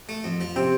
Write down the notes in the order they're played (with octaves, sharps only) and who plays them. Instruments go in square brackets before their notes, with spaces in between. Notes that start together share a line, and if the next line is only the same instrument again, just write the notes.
[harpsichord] A3
F2
F3
[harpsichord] C3 [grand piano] C4